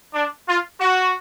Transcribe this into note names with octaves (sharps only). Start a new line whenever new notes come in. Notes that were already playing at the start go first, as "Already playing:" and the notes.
D4
F4
F#4